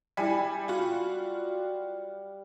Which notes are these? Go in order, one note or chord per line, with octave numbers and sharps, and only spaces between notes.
G3 E4 G#5
F4 F#4